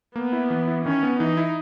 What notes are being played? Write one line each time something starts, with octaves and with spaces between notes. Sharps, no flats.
A#3 B3
E4
E3
E4
D#3 C#4
B3
E3 D#4
E4